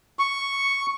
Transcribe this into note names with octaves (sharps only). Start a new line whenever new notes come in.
C#6